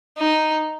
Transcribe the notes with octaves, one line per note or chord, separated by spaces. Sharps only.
D#4